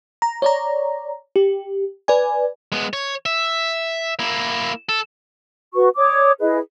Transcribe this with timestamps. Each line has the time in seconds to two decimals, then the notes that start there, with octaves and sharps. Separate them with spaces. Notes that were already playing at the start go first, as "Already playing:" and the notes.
0.22 A#5
0.42 C#5 D5 A#5
1.36 G4
2.08 B4 D5 G#5
2.72 G#3 B3
2.93 C#5
3.26 E5
4.19 A#3 E4
4.89 A4
5.75 F#4 B4 C#6
5.96 C#5 D5 D6 D#6
6.40 E4 G#4 B4 D#5